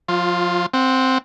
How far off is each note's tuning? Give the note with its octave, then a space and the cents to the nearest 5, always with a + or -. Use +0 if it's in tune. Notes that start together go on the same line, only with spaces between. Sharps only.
F3 +35 F4 +0
C4 +0 F#5 -20